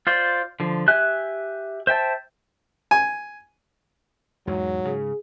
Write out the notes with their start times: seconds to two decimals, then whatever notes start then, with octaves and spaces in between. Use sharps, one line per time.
0.07 F4 C5 D5
0.60 D3 F3
0.88 G4 E5 G#5 F#6
1.87 C5 E5 G5 A5
2.91 G#5
4.47 E2 G#2 F#3 G#3
4.85 C#3 G#4